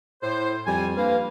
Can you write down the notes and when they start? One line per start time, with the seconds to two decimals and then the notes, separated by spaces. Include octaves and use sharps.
0.22 A2 C5
0.67 F2 G3 G#5
0.97 G2 A#3 B4 F5